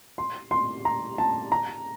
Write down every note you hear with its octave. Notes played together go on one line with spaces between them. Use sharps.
C6
C6
A#5
A5
A#5